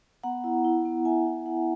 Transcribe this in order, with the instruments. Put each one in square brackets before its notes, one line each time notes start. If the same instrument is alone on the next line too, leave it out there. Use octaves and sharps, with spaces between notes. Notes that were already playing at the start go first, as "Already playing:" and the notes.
[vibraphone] B3 F#5 A#5
E4
E4
B3
B3 E5 G#5
E4
E4 F#5
E5